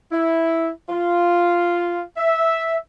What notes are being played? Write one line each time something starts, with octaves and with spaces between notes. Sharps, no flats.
E4
F4
E5